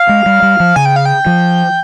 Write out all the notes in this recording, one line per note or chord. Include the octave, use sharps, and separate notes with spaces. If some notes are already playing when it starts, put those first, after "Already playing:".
Already playing: F5
G#3
G3
G3
F3
C#3 G#5
G5
F5
G5
F3